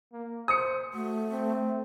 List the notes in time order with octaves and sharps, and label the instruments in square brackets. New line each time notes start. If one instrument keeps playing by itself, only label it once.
[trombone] A#3
[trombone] C5 [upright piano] D#6 C#7
[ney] A3 [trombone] F#4
[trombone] C4